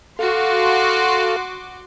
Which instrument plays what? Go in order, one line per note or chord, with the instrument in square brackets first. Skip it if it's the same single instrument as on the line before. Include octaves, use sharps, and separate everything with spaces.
[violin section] F#4 C6 D6 [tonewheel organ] A4 F5